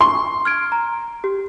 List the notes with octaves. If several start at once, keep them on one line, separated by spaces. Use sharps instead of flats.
C6 C#6
F6 G#6 D7
A#5
G4